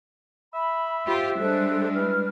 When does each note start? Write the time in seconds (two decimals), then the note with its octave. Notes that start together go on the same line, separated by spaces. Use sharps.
0.54 E5 B5
1.07 F4 G4 C5
1.38 G3 G#3 D4 A4 C5 F#6
1.93 E4 B4 F6